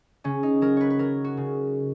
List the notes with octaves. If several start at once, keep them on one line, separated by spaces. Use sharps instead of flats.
C#3 C#4
D#4
F#3 A#4
B4 C#5
B4
F#3 A#4
F#4
C#3